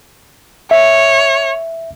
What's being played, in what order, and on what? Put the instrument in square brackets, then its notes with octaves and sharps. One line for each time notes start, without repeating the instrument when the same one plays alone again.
[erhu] C#5 [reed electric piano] E5